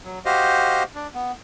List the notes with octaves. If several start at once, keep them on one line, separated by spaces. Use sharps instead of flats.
F#3
F#4 G4 C5 D#5 F5
D4
B3